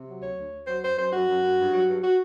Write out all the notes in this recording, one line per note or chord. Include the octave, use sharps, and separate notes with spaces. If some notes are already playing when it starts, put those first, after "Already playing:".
Already playing: C3
F#3
D2 C#5
D2
D2
F#3 C5
F#2 C5
F#2 C5
F#2 F#4
F#2
F#2
G2
F#3
G2
F#4